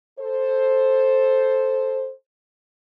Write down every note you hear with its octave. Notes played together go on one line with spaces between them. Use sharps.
A4 C5